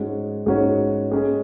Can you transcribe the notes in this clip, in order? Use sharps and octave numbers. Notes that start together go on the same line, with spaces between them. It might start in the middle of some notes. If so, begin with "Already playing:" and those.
Already playing: G#2 G#3 C#4 F#4 C#5
G#2 G#3 C#4 F#4 C#5
G#3 C#4 G#4